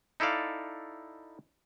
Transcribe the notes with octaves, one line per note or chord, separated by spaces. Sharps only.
D#4 E4 A4 D5 F5